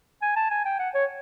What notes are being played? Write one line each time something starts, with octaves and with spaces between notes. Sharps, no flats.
G#5
A5
G#5
G5
F#5
C#5